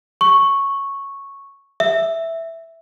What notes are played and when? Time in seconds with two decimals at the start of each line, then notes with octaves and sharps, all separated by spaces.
0.21 C#6
1.80 E5